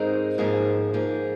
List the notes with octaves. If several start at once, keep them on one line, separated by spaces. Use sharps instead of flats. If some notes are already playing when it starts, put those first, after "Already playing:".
Already playing: G#2 G#3 C4 D#4 A#4
G#2 F3 A#3 G#4
G#2 F3 A#3 G#4